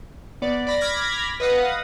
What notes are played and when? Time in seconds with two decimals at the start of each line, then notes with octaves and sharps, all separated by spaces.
0.42 B3 D5
0.67 D5 B5 A#6
0.80 B5 D6 F6 G#6 A#6 B6
1.40 B4 D#5 F5 F#5 D#6